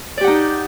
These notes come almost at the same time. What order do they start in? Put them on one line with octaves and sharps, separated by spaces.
D5 G4 F#5 D#4